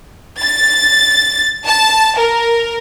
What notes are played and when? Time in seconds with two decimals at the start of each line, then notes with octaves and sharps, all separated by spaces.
0.41 A6
1.66 A5
2.18 A#4